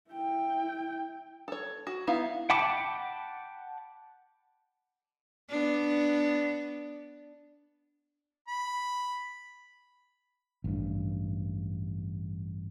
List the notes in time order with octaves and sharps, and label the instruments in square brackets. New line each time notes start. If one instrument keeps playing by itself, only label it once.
[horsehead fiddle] E4 G5
[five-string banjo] A4 C#5
F#4
B3 D#4 E4 F5
[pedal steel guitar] F#5 G5 A5 B5 D6
[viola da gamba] B3 D4
[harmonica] B5
[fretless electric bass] A1 G2